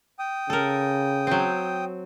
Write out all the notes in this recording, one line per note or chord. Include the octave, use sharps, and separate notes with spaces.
G5 D#6
C#3 A4 A#4
F#3 C4